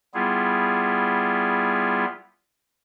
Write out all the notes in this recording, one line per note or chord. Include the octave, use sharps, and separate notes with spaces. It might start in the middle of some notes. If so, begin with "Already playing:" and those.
G3 B3 E4 F4 G#4